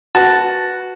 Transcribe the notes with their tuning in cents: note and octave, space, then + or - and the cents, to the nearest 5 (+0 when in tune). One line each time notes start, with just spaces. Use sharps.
F#4 +0 B4 +0 A5 +0